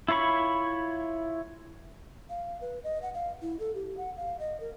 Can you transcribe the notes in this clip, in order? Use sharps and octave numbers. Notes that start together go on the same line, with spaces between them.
E4 F4 C#5 B5 C#6
F5
B4
D#5
F#5
F5
E4
A4
G4
F#5
F5
D#5
A#4